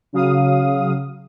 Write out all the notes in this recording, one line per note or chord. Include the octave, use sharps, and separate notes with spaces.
C#3 F#3 F5 D#6